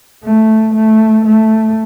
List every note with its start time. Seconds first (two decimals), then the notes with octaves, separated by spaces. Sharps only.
0.24 A3
0.75 A3
1.26 A3